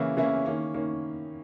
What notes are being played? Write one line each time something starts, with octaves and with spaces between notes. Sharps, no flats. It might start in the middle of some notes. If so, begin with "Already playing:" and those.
Already playing: C#3 E3 A#3 C#4 E4
C#3 E3 A#3 C#4 E4
D#3 A#3 C#4
D#3 A#3 C#4